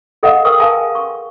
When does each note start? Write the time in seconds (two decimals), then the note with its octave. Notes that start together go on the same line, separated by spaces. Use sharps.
0.23 G#4 A4 D#5 F5 F#5
0.45 A#4 B4 G5 C#6 D#6
0.59 G#4 F5 G#5 A5 C#6
0.95 C#6